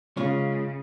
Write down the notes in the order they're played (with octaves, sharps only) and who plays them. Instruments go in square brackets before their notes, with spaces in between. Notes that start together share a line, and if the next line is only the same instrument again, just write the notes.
[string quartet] C#3 [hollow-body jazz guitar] G#3 F4 C#5